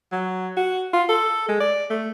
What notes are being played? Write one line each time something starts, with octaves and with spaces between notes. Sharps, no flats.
F#3
F#4
F4
A4
G#3
D5
A3